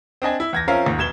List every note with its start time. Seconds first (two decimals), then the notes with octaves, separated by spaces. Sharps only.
0.22 C4 D4 D#5 G#5
0.40 E4
0.53 E2 G#6 A#6
0.68 F3 C4 C#4 A#4 E5 F5
0.86 D#2 G#2
0.98 F1 B2 G#6 E7 G7